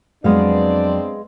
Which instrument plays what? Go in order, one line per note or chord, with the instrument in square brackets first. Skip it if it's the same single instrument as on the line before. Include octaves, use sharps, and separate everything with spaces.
[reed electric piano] F2 F#3 [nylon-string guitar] G#3 B3 F5 [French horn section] C4 D4 D5